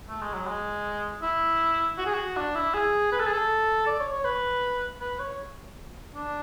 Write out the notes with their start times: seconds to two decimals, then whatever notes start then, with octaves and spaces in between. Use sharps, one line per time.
0.09 A3
0.21 G#3
0.34 F#3
0.47 G#3
1.22 E4
1.98 F#4
2.06 G#4
2.14 F#4
2.37 D4
2.55 E4
2.74 G#4
3.12 B4
3.19 A4
3.27 G#4
3.34 A4
3.87 D5
4.00 C#5
4.13 C#5
4.25 B4
5.00 B4
5.19 C#5
6.14 D4